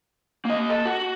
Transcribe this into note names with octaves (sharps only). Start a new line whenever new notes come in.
A#3 D#5
A4
F#4